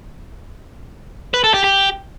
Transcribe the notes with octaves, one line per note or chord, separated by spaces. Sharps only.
B4
A4
G4
G4